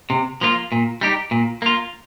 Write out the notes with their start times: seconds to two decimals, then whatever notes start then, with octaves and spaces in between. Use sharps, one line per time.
0.10 C3
0.41 F3 A#3 F4
0.72 A#2
1.01 G3 D#4 G4
1.31 A#2
1.62 A#3 F4